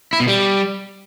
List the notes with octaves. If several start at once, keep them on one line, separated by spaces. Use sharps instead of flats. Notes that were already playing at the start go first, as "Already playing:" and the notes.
E4
B2
G3